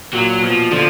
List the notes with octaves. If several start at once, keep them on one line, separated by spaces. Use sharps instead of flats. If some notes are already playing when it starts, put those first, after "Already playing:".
A#2 F#3
B2 F3
D3 F3